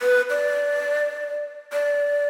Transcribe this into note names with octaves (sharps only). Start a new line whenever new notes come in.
B4
D5
D5